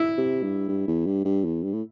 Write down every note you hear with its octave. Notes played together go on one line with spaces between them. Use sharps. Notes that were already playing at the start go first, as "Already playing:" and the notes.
Already playing: E4
C3
G2
G2
E2
G2
G2
E2
G2
A2